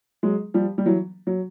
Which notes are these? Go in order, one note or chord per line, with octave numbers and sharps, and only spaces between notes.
F#3 G#3
F3 G3
G3
E3 F#3
F#3